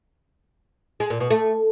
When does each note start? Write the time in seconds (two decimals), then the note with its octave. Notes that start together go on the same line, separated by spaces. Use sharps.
1.00 G#3
1.10 A#2
1.20 B2
1.30 A3